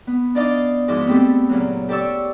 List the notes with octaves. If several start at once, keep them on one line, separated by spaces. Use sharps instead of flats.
B3
D4 D#4 D5 D#5 F5 D6
G#2 F3 E4 F#4 D#5 D6
A3 B3 C4 E4 G4 A4
A#2 C#3 F#3
G4 A4 D5 C#6 E6